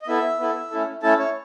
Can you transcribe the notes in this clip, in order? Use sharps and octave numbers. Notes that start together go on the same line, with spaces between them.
D#5
B3 E4 A4 E5
B3 E4 A4
A3 C#4 E4 A4
A3 C#4 E4 A4 A5
C#5